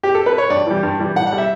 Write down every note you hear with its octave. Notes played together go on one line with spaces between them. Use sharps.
G4
A4
B4
C#5
G2 D5
E3 G3
G2
E3 G3
A2 F#5
F#5
G3
E5